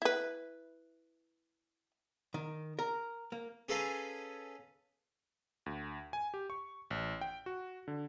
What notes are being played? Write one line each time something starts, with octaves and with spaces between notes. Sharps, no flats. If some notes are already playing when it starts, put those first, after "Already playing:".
E4 B4
D#3
A#4
A#3
C#4 G#4 A4 B4 F5 A#5
D2
G#5
G4
C#6
A1
G5
F#4
D3